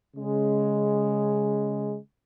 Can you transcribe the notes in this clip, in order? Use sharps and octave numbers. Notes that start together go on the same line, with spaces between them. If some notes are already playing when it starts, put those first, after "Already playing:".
C#3 G#3